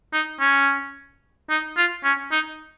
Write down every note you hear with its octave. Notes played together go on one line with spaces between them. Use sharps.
D#4
C#4
D#4
F4
C#4
D#4